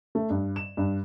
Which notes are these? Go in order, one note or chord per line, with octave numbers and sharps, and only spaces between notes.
A3
G2
E7
G2